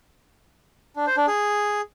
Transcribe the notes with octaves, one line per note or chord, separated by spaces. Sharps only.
D4
C5
D4
G#4